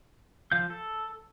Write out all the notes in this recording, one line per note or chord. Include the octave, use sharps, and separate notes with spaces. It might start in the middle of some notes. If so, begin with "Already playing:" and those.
F3 F5 G6
A4